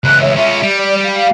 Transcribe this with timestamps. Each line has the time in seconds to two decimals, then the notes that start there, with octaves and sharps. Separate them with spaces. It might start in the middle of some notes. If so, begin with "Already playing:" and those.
0.04 C#2 E3 F#6
0.21 C#5 E5
0.36 C#4 F4 E5
0.62 G3
0.78 D5
1.04 F5